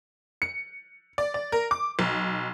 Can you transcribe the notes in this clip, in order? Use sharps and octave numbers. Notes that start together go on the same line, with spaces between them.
C#7
D5
D5
A#4
D6
B1